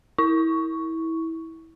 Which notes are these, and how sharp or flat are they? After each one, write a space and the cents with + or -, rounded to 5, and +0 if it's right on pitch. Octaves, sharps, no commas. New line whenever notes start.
E4 -20 C#6 +5